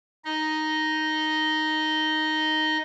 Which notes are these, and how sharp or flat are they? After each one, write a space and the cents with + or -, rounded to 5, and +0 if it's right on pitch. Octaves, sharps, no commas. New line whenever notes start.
D#4 +0 D#5 +0